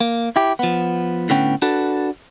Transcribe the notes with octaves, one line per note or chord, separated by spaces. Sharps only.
A#3
E4 G4
F3 B3
A2 D3 B3 C#4 G5
D4 F#4 A4 B4